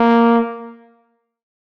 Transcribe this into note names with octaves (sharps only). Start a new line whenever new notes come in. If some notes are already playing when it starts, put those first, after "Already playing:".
Already playing: A#3